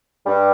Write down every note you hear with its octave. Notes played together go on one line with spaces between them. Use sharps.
G2 G3